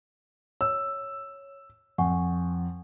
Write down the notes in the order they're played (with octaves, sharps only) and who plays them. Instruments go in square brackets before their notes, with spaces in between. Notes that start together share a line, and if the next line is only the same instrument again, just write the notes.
[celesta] C#5 [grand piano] E6
[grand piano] F2 [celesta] F#5 G#5 C#6